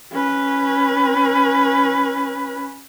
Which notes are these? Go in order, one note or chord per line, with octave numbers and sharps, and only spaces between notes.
C#4 B4